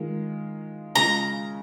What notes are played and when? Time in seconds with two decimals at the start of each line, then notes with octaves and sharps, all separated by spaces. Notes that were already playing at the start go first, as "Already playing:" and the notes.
Already playing: D#3 G#3 F4
0.95 C#3 G#3 F4 A#5